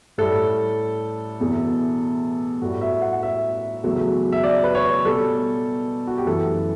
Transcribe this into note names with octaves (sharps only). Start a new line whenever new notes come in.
A2 G3 A4
E2 B2 A3
A2 G3 F#4
E5
F#5
E5
E2 C#3 F#3 A3
E5
D5
B4
C#5
B2 G3 A4
F#4
G4
F#2 E3 A3 A4